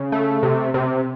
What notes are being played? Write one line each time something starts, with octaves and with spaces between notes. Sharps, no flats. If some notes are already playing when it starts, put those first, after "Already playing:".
Already playing: C#3
A3
C3
C3